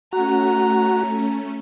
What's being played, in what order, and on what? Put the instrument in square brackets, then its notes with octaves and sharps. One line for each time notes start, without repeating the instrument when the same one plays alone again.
[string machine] A3 C#4 [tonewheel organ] F#4 [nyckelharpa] A#5